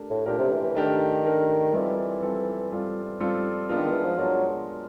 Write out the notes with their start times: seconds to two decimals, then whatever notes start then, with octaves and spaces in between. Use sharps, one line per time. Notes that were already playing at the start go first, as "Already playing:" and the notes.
Already playing: A3 D4 G4 A#4
0.10 A2
0.26 A#2 A3 D4 G4 A#4
0.38 C3
0.51 E3
0.63 E3
0.75 D#3 A3 D4 G4 A#4
1.25 A3 D4 G4 A#4
1.73 E3 G3 C4 F4 A4
2.22 G3 C4 F4 A4
2.72 G3 C4 F4 A4
3.20 G3 C4 F4 A4
3.69 G#3 B3 D4 F4 A#4
3.77 D#3
3.91 E3
4.05 F3
4.18 F#3 G#3 B3 D4 F4 A#4